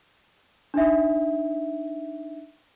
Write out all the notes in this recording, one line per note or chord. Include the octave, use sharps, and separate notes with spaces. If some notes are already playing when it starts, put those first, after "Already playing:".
D4 D#4 E5